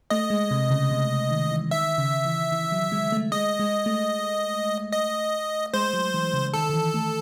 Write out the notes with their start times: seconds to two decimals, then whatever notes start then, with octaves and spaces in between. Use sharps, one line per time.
0.10 A3 D#5
0.30 G#3
0.51 C3
0.70 C#3
0.91 C3
1.31 D#3
1.51 E3
1.71 D#3 E5
1.98 C#3
2.25 E3
2.52 E3
2.72 F#3
2.92 G#3
3.12 A3
3.32 G#3 D#5
3.60 G#3
3.86 A3
4.93 D#5
5.74 G#3 C5
5.93 F#3
6.14 E3
6.34 C#3
6.53 D#3 A4
6.70 D#3
6.74 E3
6.94 A3